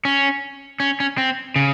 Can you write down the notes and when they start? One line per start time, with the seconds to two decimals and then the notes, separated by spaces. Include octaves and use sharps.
0.05 C#4
0.80 C#4
1.00 C#4
1.18 C4
1.56 C#3